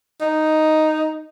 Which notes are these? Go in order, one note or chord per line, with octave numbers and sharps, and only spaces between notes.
D#4